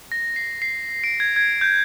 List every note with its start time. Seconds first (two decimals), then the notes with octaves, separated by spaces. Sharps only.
0.12 A#6
0.36 C7
0.62 C7
1.04 D7
1.20 G#6
1.36 G#6
1.61 G6